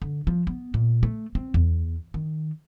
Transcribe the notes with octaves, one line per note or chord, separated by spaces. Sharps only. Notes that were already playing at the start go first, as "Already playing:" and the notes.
D3
F3
B3
A#2
A3
C4
E2
D#3